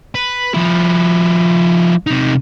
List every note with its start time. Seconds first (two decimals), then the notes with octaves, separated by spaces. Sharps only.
0.15 B4
0.54 F3 E4
2.07 C3 D#4